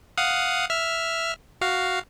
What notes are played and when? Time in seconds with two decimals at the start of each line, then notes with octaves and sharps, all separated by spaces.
0.18 F5 F#5 D#6
0.70 E5 F6
1.61 F#4 F5